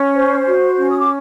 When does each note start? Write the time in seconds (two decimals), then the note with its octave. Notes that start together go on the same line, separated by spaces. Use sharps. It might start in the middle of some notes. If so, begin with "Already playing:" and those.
Already playing: C#4
0.15 C5
0.46 F#4
0.78 C#4
0.90 D#6
0.99 D6